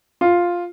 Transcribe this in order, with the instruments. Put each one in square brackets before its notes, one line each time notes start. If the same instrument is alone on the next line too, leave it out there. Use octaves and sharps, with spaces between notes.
[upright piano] F4